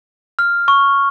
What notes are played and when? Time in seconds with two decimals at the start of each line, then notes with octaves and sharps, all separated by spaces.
0.39 F6
0.68 C#6